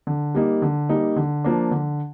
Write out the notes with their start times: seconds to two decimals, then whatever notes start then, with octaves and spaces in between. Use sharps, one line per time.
0.07 D3
0.35 G3 A#3 D#4
0.62 D3
0.89 G3 A#3 D#4
1.16 D3
1.44 F3 A#3 D4
1.71 D3